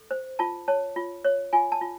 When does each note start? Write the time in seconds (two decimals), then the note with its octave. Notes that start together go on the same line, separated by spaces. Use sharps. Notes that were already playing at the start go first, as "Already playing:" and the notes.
Already playing: A4
0.11 C5
0.39 F4 A5
0.68 C#5 A5
0.96 F4
1.25 C#5
1.53 F4 G#5
1.72 A5
1.81 F4